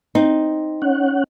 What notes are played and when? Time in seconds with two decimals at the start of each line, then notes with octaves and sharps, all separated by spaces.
0.15 C4 D#4
0.82 C#4 F#5